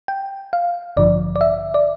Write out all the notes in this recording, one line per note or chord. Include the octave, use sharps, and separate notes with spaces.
G5
F5
A1 G2 D3 F3 D5
D5
E5
D5